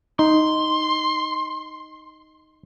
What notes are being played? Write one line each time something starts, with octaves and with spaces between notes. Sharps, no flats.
D#4 C6